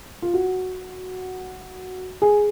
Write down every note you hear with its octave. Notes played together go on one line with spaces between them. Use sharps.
F4
F#4
G#4